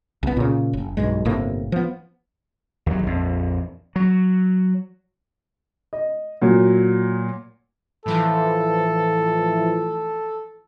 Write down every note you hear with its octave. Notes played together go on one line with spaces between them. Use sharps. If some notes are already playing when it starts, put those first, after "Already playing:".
C2 B3
A#2 C#3
F#1
B1 G2 G#3
G1 A2 C3 A#3
F3 B3
D#2 F#3
A#1 F2
F#3
D#5
A#2 F#3
A2 E3 F3 A4